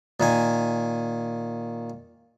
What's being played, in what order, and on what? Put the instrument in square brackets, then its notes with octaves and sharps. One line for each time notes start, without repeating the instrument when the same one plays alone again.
[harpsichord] A#2 D#3 G#5